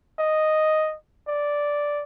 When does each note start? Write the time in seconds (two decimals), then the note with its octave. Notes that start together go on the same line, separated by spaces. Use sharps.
0.19 D#5
1.28 D5